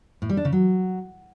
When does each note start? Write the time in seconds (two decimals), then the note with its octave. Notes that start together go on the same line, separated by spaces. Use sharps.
0.22 A2
0.29 G3
0.37 D4
0.45 C#3
0.52 F#3